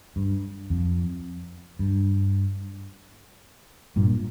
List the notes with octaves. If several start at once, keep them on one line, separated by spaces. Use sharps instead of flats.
G2
F2
G2
G2 A#2